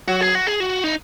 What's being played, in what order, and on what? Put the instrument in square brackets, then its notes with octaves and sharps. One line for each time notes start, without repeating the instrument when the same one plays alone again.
[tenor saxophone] F#3 [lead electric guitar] F#4
[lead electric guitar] G#4
F#4
G#4
F#4
D#4